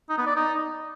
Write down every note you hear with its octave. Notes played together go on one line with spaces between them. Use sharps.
D#4
B3
D5
D#4